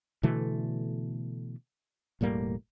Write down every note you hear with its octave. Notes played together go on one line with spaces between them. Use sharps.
B2 D3 E3 A3
E1 A2 G3 A#3